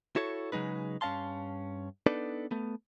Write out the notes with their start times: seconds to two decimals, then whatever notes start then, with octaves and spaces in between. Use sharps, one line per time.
0.16 E4 F#4 A4 C#5
0.52 C#3 F#3 G#3 D#4 B4
1.01 G2 C#4 D#5 F5 A5 C6
2.06 B3 D4 D#4 A4 B4 D5
2.51 A3 B3